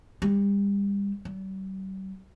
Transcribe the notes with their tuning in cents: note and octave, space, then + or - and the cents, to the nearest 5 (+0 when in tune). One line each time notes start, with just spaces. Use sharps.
G3 +35
G3 -45